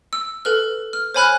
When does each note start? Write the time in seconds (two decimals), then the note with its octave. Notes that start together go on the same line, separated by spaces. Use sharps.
0.13 E6
0.45 A4 B4 F6
0.93 F6
1.14 C5 C#5 G#5 B5 F6 F#6